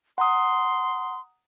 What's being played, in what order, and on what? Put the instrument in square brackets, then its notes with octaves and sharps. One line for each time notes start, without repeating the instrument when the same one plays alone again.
[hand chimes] F#5 A#5 D#6 [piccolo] C6